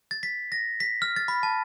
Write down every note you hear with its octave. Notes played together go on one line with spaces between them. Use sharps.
A6
B6
A#6
B6
F6
A6
B5
A5